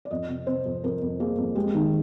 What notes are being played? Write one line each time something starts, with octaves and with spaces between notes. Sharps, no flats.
D5
F2 D#5
C3
C3 C5
F2
F2 A#4
F2
A#3 G#4
F2
G#3 G4
D#3